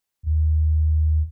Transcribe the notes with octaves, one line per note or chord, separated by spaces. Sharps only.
D#2